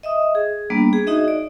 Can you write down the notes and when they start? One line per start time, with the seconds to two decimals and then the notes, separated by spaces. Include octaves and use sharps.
0.03 D#5 E5 D#6
0.35 G#4
0.70 G3 A#3 B3 D4
0.93 G#4
1.07 D#4 F#4 G#4 D#5 E5
1.28 D5